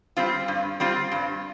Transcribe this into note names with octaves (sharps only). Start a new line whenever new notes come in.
G3 C4 F4
G2
G3 C4 F4
G2